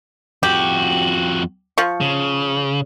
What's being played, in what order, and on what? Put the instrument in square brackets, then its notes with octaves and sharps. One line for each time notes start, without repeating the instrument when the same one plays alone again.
[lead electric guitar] F2 F#4 [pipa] G4
[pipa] F3 C#6
[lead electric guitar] C#3